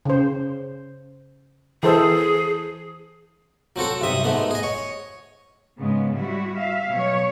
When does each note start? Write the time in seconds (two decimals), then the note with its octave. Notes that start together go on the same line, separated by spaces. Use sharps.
0.05 C#3 C5
1.83 E3 G#4 A4 C5
3.76 F#3 C4 F#4 A4
4.01 B1 G2 C3 E5 D#6
4.24 G#2 A3 B3
4.51 G#4 D#5
4.63 C#5
5.78 G#2 C#3 G#3 B3
6.13 G3 E4 F#4
6.56 E5 F5
6.90 B2 F#3 C#5